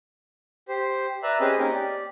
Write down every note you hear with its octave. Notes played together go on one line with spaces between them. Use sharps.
G4 C5
B4 D5 E5 A#5 E6 F#6
C4 C#4 G4 G#4 B4 D#5
A#3 C4 C#4 D#4 G4 A#4
G4 D5